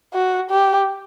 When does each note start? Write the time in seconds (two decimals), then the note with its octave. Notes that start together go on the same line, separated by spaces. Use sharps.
0.14 F#4
0.50 G4